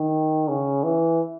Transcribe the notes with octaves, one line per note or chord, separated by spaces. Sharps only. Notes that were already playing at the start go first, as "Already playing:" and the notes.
Already playing: D#3
C#3
E3